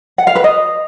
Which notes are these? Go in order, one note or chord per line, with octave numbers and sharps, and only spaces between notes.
F#5
F5
B4
D#5